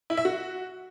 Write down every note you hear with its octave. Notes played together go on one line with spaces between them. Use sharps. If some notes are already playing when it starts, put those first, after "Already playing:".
E4
E5
F#4